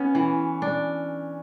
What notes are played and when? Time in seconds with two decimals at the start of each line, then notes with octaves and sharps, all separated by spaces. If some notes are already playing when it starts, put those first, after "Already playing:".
Already playing: B3 C#4
0.15 E3
0.62 D4